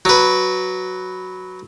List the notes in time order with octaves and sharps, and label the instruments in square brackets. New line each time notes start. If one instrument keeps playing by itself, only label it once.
[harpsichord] F#3 B4